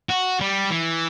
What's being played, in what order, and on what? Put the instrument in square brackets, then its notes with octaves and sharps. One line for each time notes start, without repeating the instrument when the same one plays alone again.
[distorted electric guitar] F#4
G3
E3